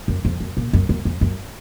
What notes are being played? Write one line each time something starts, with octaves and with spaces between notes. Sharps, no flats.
F#2
F2
F#2
A#2
F#2
F#2
F2
F#2